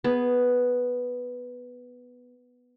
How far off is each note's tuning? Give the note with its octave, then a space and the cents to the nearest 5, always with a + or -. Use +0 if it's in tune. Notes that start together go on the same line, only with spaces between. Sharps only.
B3 +0 G#4 +0